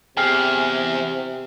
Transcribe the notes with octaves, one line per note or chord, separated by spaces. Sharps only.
E2 C3 G#4 G5 F6 C7